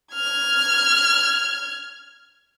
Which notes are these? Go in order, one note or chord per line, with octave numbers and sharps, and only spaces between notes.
F6 G#6